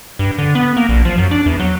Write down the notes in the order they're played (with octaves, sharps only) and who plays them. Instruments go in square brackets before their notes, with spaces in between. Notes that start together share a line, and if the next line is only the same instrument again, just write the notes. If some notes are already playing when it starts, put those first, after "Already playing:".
[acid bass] G2
D3
B3
A#3
A#1
F3
F#2
D4
E2
F#3